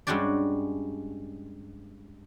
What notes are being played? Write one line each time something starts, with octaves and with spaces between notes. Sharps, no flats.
G2 G#3 C#4 F#4 G4 D5